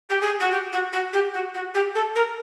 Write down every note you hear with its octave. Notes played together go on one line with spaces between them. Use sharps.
G4
G#4
F#4
G4
F#4
F#4
G4
F#4
F#4
G4
A4
A#4